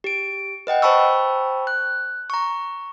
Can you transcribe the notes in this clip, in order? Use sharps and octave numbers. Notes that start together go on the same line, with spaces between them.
G4 D7
B4 D#5 F#5 G5
C5 G5 A5 B5 C#6 E6
F#6
A#5 C#6